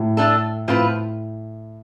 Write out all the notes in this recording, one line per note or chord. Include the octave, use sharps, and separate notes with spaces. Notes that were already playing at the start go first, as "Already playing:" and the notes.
Already playing: A2
A3 D4 A4
A2 F3 C4 F4 B4